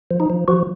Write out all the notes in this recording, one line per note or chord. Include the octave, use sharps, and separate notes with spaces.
F3
D#4
F3
F3 F#4